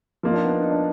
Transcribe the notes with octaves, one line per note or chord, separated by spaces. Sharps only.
F3 A#3 D#4 F4
D4
B3 D#4
D#4
D4